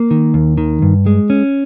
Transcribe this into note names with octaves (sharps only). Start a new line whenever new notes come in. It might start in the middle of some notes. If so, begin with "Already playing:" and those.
Already playing: A#3
D#3
D#2
D#3
G2
G#3
C#4